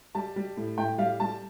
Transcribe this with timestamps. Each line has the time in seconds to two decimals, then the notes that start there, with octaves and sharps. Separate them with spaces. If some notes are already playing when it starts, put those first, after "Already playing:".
0.15 G3 A5
0.36 G3
0.57 A2
0.78 A2 G5
0.98 G3 F5
1.20 G3 A5